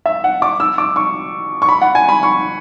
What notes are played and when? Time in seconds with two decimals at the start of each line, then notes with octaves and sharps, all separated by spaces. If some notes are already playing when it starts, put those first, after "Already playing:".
0.06 E5
0.24 F#5
0.42 D6
0.60 E6
0.78 D6
0.96 C#6
1.62 C#6
1.69 B5
1.82 F#5
1.95 G#5
2.09 B5
2.23 C#6